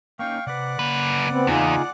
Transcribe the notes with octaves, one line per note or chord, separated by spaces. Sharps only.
A#3 C#4 D#4 F5 G5 C#6
C3 B4 D5 F#5 D6
F#2 C#3 A#3 B4
B3 C4
E2 D#4 F4 G#4